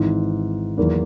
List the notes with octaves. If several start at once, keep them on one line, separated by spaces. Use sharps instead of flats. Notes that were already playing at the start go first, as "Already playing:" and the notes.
Already playing: G#1 G#2 E3
E2 D#3 F#3 A#3 E4